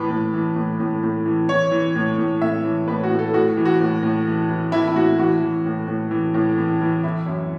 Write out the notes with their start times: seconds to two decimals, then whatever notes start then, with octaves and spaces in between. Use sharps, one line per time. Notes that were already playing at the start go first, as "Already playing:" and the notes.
Already playing: A2 E3 B4
0.10 A2
0.34 E3
0.56 A2
0.80 A2
1.03 A2
1.26 E3
1.49 E3 C#5
1.72 E3
1.95 A2
2.18 A2
2.42 A2 E5
2.64 E3
2.88 A2 B4
3.03 F#4
3.11 A2
3.19 A4
3.33 A2 F#4
3.57 E3
3.65 F#4
3.80 A2
4.03 A2
4.27 E3
4.49 E3
4.72 E3 E4
4.87 E4
4.96 A2 F#4
5.19 E3 F#4
5.42 E3
5.66 A2
5.88 A2
6.11 E3
6.34 A2
6.57 E3
6.81 E3
7.04 E3 E4
7.26 F#2